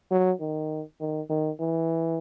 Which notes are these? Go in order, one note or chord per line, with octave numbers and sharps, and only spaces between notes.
F#3
D#3
D#3
D#3
E3